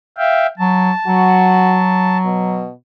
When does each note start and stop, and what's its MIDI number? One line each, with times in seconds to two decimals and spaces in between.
0.18 0.47 76
0.18 0.47 77
0.18 0.47 79
0.58 0.92 54
0.58 2.17 81
1.07 2.66 54
1.07 1.82 66
2.26 2.72 47